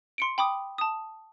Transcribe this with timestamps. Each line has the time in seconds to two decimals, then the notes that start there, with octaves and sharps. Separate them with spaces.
0.18 C6 C#7 D7
0.38 G5 B5 D6 D#6
0.78 A5 D#6